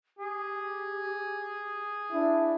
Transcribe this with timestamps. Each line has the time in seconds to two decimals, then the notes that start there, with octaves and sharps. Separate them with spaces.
0.19 G4 G#4
2.12 D4 E4